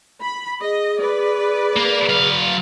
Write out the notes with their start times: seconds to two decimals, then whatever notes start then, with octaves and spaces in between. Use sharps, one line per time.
0.22 B5
0.61 G#4 D#5
1.00 B4 D5
1.77 A#3
2.10 F#3 F5